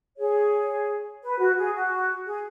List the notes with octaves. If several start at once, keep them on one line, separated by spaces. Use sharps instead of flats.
G#4 C#5
B4
F#4
G#4
F#4
G#4